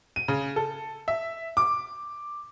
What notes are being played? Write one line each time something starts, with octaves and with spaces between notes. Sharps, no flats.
D#7
C#3
A4
E5
D6